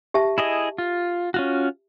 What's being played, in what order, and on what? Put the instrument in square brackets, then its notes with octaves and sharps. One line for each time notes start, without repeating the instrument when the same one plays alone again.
[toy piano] G4 E5 A5
[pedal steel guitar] E4 G#4 D#5
F4
C#4 F4 F#4